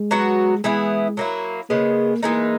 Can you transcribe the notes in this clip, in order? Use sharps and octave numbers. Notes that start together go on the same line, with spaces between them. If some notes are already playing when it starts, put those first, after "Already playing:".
Already playing: G#3
F#3 B3 F#4
E3 G#3 B3 E4 G#4
F#3 A#3 E4
C#3 G#3 A#3 B3
E3 G#3 A#3 D#4